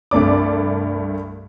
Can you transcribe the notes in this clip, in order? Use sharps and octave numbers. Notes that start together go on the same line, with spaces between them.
C2 G2 A3 D5 D6